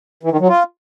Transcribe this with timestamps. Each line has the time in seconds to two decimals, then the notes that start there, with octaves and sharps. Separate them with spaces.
0.23 E3
0.32 D#3
0.40 F#3
0.48 F4